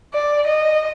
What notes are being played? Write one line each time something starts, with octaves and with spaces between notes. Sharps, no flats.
D5
D#5